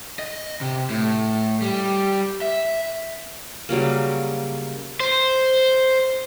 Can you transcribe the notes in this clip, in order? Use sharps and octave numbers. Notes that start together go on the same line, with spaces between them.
D#5
C3
A2
G3
E5
C#3 F#3 G3 A#3
C5